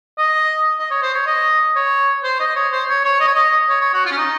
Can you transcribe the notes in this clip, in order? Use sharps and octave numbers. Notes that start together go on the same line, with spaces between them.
D#5
D#5
C#5
C5
C#5
D#5
C#5
C5
D#5
C#5
C5
C#5
C#5
D#5
C#5
D#5
C#5
C#5
F#4
F4
C#4
D#4